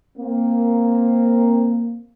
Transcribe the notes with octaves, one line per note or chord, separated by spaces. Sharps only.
A#3 C4